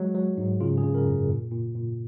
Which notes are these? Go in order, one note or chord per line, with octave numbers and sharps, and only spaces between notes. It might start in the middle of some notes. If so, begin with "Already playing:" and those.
Already playing: F#3 G#3
F#3
G#2
C#3 F4
G#4
C#3
A#4
F#2
A#2
A#2
A#2